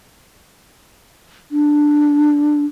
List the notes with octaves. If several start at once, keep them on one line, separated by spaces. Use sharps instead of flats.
D4